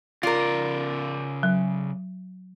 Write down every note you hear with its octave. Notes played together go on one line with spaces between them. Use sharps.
C#3 F4 A#4 D5
F#3